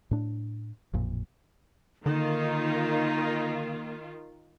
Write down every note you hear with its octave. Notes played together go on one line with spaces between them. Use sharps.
A2 D4
A1 F2 A#2
D3 D#3 A#3 D#4 F4